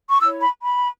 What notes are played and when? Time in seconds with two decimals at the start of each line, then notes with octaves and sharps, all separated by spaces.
0.10 C#6
0.21 E4 C#5 E6
0.42 B5
0.63 B5